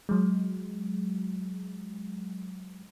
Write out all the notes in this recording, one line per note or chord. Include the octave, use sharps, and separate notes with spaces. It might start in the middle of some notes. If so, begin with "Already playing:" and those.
F#3 G#3